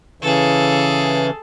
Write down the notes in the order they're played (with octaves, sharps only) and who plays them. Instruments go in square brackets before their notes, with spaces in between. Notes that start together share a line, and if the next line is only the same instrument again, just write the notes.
[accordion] C#3 E3 [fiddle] G#4 A4